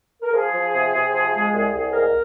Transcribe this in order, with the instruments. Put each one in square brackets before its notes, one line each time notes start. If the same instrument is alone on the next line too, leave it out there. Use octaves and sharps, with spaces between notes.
[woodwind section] A#4
F3 G#4
F3
C3
C3
F3
G#3
C2
C2
G#2 A#4